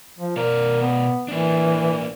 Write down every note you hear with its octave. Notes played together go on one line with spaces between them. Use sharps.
F3
B2 A#4 D5
B3
E3 A#3 D4